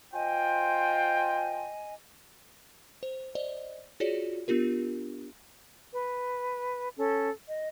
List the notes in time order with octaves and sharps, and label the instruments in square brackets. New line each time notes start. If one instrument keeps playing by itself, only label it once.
[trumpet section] F4 C5 G5 [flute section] D#5 G#5
[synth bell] C5
C5 D5 D#5
F4 F#4 G#4 C#5 D5
B3 D4 F4 G4 A#4
[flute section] B4
C#4 A4
D#5